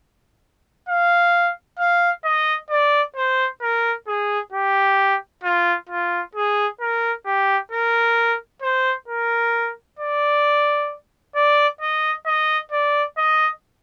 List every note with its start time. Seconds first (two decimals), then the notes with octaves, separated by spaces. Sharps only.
0.89 F5
1.79 F5
2.25 D#5
2.70 D5
3.16 C5
3.62 A#4
4.07 G#4
4.53 G4
5.44 F4
5.89 F4
6.35 G#4
6.81 A#4
7.26 G4
7.72 A#4
8.62 C5
9.08 A#4
9.99 D5
11.35 D5
11.81 D#5
12.26 D#5
12.72 D5
13.18 D#5